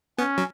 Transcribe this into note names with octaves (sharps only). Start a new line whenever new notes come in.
B3 C#4
F#3